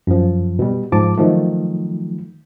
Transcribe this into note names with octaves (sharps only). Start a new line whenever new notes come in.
F#2 F3
B2 G3
G#2 F3 A5 D6
D#3 F3 F#3 A3